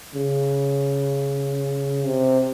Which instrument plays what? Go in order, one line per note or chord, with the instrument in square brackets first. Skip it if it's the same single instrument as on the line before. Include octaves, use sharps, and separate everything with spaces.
[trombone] C#3
C3